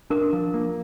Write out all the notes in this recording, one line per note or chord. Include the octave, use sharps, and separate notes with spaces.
D4 A#4
F3
A#3